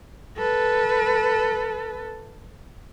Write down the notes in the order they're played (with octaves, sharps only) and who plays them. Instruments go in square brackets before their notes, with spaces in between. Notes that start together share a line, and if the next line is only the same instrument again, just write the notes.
[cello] A4 B4